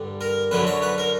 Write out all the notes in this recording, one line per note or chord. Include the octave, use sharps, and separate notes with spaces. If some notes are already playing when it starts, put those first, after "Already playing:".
Already playing: G2 D3 G3
A#4
F#2 D3 F#3 B4
C#5
B4
A#4